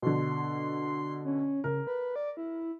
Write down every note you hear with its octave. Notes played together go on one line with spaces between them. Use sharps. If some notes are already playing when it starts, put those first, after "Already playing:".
B2 D3 C6
C#4
C#3 A#4
B4
D5
E4